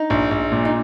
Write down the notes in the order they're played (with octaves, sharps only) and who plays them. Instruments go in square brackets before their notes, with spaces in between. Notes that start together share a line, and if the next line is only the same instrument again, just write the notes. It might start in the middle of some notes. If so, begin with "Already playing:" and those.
Already playing: [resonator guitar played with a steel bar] D#4
[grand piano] A#1
A#1
A#2
[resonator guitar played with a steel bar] D#4